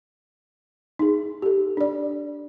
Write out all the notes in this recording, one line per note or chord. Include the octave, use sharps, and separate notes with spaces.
D#4 G#4
G4 A4
D4 D5